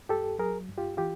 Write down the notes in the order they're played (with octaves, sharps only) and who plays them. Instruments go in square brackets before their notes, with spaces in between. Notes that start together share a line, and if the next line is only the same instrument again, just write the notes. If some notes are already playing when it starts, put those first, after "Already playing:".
[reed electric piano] G2 G4 A4
F#3 G#4 A#4
G2
F4 G4
E3 F4 G4